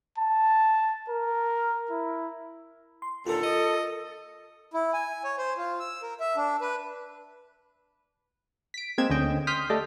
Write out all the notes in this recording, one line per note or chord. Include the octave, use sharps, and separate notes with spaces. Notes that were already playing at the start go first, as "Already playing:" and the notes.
A5
A#4
E4
C6
D#2 A#2 D3 F4 A4 A#4
D#5
E4
G#5
C#5
C5
F4
E6
A#4
E5
D4
B4
B6 D7
G#3 A#3 C4 G#6 E7
D2 D3 C#4 D#5 G5
C6 D#6 F6 G6 B6
A3 G4 A4 D5 D#5